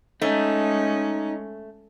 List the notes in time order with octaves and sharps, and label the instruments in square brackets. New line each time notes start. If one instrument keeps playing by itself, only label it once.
[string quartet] G#3 C#4 [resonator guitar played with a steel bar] A3 [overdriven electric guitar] D#4